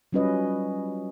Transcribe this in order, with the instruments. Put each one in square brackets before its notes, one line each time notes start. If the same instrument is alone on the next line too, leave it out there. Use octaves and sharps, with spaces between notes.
[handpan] F#3 G3 C#4 F4 B4 D#5